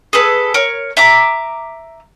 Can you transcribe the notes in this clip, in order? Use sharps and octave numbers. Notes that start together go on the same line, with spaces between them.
G#4 A4 B4
A#4 C#5
E5 A#5 D6